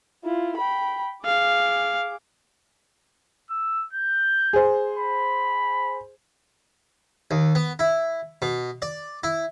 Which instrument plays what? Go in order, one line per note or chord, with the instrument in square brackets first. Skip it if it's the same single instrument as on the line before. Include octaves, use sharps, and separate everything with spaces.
[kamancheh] E4 F4
G5 B5
[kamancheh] G#4 D6 [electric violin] F5
[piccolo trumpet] E6
G6
[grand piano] G#4 C5
[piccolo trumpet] B5
[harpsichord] D#2
B3
E4
B2
D5
E4